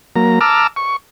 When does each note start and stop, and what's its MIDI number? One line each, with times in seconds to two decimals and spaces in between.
0.16 0.39 54
0.16 0.39 58
0.16 0.39 82
0.41 0.67 81
0.41 0.67 82
0.41 0.67 86
0.41 0.67 88
0.41 0.67 89
0.76 0.96 85